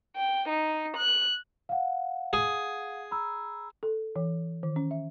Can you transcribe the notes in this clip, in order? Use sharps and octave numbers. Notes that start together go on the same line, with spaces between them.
G5
D#4
F#6
F5 F#5
G#4
A#5 B5 E6
A4
E3
D#3
C#4
E5